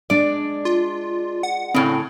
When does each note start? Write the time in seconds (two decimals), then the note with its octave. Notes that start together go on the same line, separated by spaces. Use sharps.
0.10 G#3 D4 D5
0.65 F4
1.43 F#5
1.75 A2 C#3 C4